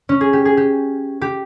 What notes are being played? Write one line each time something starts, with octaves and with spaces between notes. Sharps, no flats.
C#4
G#4
G4
G#4
G4
G4